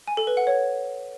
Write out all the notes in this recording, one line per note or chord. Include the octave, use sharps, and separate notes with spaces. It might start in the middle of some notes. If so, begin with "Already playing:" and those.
G#5
A4
B4
F#5
C#5